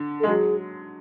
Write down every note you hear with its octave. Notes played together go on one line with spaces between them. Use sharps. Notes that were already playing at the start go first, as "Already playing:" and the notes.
Already playing: D3
A4
G#3
F#3 G#4